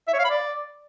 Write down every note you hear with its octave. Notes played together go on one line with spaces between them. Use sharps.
E5
C#5
F5
B5
D5